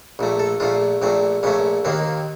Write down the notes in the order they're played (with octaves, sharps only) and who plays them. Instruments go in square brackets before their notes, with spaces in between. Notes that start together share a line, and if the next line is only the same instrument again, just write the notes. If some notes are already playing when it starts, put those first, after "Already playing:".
[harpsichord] A#1 A#2 A3
A4
A#1 A#2 A3 F4
A#1 A#2 A3 C4
A#1 A#2 A3 C#4
D#2 D#3 A#3 C4